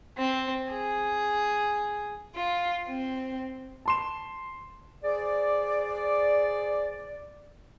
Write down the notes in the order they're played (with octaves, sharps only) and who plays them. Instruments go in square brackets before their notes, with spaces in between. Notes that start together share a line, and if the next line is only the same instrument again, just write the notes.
[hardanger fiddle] C4
G#4
[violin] F4
C4
[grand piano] A5 C6 E7
[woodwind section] G#4 C5 D5